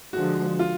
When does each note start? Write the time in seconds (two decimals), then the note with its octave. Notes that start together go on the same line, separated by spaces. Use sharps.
0.13 D3 F3 G#3 F#4
0.59 F4